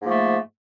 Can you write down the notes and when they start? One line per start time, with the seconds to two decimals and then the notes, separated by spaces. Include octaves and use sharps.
0.01 G#2
0.04 A#3
0.07 F3
0.09 A3